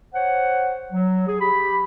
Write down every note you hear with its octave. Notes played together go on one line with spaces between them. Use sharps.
C5 C#5 F#5
F#3
G#4
G4 B5